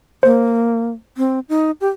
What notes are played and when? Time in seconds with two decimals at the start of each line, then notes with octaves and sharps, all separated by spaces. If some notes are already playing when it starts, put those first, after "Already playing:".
0.23 A#3 C5
1.18 C4
1.49 D#4
1.81 G4